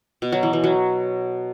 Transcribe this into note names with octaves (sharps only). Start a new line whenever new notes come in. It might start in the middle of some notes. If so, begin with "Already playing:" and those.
B2
F#3
E3
E3
F#3